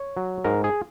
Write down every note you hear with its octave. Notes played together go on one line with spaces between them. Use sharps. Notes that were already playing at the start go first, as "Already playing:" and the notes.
Already playing: C#5
F#3
G#2 A#4
G#4